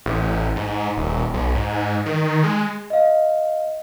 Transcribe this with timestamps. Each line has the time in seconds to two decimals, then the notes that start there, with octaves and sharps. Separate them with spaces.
0.06 A1
0.56 G#2
0.97 D#1
1.34 B1
1.55 G#2
2.06 D#3
2.43 G#3
2.90 D#5 F5